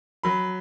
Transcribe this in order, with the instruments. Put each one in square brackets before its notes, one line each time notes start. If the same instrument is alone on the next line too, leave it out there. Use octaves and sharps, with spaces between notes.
[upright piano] F#3 B5